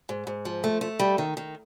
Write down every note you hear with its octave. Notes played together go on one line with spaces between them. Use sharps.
G#2
G#2
F3
A3
A3
G3
D#3
D#3